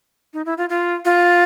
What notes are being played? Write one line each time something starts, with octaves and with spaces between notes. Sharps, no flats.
D#4
E4
F4
F4
F4